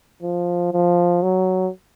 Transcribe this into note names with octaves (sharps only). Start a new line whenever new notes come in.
F3
F3
F#3